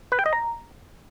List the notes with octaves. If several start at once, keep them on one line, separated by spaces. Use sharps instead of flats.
B4
G5
D#5
A#5